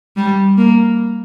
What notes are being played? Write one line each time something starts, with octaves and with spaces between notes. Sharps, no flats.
G3
A#3